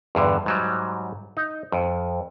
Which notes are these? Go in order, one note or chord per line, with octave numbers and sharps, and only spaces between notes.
E2 G2 D3
G#2 F#3 G3
D#4
F2